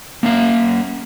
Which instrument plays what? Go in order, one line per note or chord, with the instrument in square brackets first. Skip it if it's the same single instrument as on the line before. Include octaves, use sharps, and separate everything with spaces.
[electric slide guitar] A#3 C#4 F5